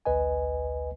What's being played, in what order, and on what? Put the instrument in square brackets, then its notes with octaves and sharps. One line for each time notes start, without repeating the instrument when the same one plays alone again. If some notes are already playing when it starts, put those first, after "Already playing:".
[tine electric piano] A1 D2 B4 D#5 G#5